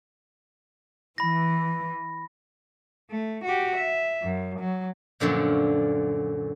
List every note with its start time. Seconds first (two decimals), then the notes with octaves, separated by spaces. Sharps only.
1.18 E3 B5 A#6
3.11 A3
3.45 F#4 G4
3.76 E5
4.23 F#2
4.60 F#3
5.20 F#2 A#2 D3 F3